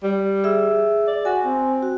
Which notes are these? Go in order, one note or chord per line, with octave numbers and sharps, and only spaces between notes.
G3
G#4 E5 E6
D5
F#4 G#5
C4
F#4